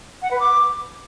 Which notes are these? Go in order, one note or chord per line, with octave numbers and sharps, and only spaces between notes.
F#5
B4
D6